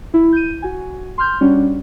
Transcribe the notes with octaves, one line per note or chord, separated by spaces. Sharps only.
E4
G6 D#7
F#4 G#5
C6 F6 G6
G3 C#4 D4 F#4